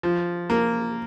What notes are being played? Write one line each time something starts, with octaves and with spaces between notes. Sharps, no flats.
F3
A#3